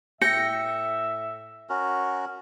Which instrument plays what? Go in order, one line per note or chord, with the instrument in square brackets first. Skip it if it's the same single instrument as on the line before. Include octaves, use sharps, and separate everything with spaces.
[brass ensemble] A2 E5 [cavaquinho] G5 [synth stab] A#6 C#7
[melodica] C#4 F#4 A#4